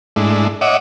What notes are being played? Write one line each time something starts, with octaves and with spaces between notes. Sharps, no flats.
G#2 G#3 A3 D4 E4
C#5 D#5 E5 F#5 D6